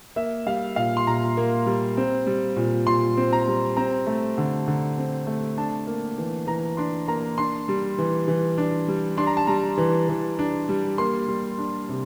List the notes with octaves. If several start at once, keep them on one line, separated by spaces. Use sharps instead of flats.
A#3 E5
G3 F5
A#2 F5
C6
A#2 A#5
A#3
G3
C4
G3
A#2
A#2 C6
C4
A#5
G3
C4 A#5
A3
D3
D3
C4
A3
D4 A5
A#3
E3
E3 A#5
D4 C6
A#3 A#5
D4 C6
G3
E3
E3
D4
G3
D4 C6
A#5
A5
G3 A#5
E3
E3
D4
G3
A#3 C6
G3
D4
C3